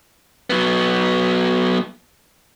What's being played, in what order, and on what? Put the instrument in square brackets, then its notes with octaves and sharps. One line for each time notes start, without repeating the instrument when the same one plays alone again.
[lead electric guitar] F#3 B3